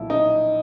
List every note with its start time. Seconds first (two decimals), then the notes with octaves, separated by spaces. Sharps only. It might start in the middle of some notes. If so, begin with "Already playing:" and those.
Already playing: B1 A#2 F3 E4
0.10 D#4